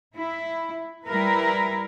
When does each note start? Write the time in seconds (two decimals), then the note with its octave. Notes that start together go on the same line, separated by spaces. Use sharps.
0.14 E4
1.05 G3 E4 A#4 B4